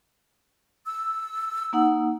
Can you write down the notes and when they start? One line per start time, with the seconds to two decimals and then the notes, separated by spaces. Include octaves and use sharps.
0.85 E6
1.73 A#3 D#4 F#5